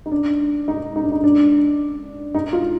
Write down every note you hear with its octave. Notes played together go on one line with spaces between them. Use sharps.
D#4
D4
D#4
D#4
D4
D#4
D4
D#4
F4